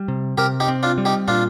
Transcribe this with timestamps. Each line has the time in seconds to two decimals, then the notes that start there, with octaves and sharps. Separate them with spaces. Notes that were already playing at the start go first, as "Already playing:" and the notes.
Already playing: G3
0.08 C3
0.38 C3 G4 A#4
0.60 D#4 G4
0.68 C4
0.83 D4 F4
0.98 G3
1.05 D#4 G4
1.28 A#2 D4 F4